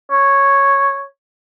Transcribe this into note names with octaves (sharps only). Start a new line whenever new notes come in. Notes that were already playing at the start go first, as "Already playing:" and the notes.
C#5